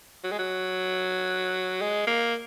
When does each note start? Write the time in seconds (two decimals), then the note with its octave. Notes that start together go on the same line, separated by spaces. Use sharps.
0.24 F#3
0.32 G#3
0.39 F#3
1.81 G#3
2.07 A#3